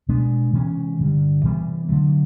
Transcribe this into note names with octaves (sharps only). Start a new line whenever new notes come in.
B2 G#3 B3 D4
C3 E3 G#3 C#4
G2 D3 G3
C3 E3 G3 B3
D3 F#3 A3